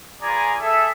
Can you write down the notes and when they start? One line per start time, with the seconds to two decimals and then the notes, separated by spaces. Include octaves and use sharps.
0.22 F4 G#4 B4 D5 G#5 A#5
0.60 G#4 A4 E5